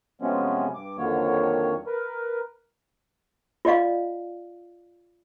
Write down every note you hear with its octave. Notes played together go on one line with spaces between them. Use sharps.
C3 F3 F#3 G#3 B3 C#4
G2 D6
F2 D3 D#3 F#3 A#3 C#5
A#4 B4
F4 D5 D#5 F5